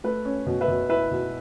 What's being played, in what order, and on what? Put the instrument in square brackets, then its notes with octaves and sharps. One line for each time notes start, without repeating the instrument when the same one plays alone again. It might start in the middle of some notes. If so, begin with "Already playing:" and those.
[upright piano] A3 B4
C#4
B2
B4 E5
B2
E4 B4 E5
B2